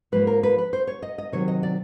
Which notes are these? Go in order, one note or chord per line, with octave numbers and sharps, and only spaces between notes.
G#2 F3 A#3 B4
A#4
B4
B4
C5
C#5
D#5
D#5
C3 D#3 F#3 C#5
D#5
D5